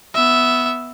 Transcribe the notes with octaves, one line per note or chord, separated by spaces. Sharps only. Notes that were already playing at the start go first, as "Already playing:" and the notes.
B3 E5